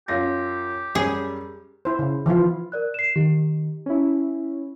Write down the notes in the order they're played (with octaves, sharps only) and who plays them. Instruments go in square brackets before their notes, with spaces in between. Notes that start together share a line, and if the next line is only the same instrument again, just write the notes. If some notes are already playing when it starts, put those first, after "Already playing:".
[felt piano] F#2 F4 A#6 [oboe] G4
[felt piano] F#2 G3 [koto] G#4
[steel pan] E4 C5
C#3
E3 F3 E4 F4
[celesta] A#4 D5 F#6
C7 E7
[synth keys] D#3 [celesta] G4
[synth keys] C#4 E4